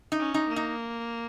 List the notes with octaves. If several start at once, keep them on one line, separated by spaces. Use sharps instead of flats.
D#4
C#4
D#4
A#3
D#4